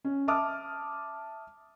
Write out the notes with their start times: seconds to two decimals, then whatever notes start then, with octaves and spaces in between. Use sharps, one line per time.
0.05 C#4
0.28 E5 A5 D6 D#6 F6